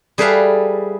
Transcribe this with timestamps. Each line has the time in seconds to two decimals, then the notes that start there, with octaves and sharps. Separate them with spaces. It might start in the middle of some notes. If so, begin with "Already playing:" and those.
0.18 G3 G#4 A4 B4 E5 F5